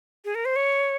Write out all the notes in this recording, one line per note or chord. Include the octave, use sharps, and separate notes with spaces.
G#4
A#4
C5
C#5